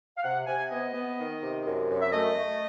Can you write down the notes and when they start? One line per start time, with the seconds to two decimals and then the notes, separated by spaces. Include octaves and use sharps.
0.17 F5
0.23 C3 F#5
0.46 C3 G#5
0.70 B3 D#5
0.94 B3
1.18 D#3
1.41 C3
1.65 F#2
1.89 F#2
2.01 E5
2.12 A3 D#5
2.36 A3